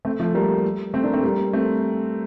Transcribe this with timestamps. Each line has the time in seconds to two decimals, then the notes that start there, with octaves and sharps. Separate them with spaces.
0.05 A3 C4
0.19 F3 A3
0.34 G3 A#3
0.94 A3 C4
1.03 A#3 D4
1.13 A3 C4
1.24 G3 A#3
1.53 A3 C4